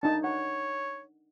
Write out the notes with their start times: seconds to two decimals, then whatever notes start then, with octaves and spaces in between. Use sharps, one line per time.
0.03 D4 D#4 A5
0.24 C#5 F#5